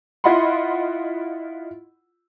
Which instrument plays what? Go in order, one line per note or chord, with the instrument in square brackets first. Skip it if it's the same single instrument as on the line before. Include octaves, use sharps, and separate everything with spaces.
[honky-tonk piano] E4 F4 D#5 F#5 B5 C6